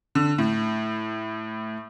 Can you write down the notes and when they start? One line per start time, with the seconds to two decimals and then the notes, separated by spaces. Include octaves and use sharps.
0.15 D3
0.38 A2